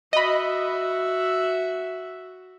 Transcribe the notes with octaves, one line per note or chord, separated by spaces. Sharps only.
F#4 D#5 E5 B5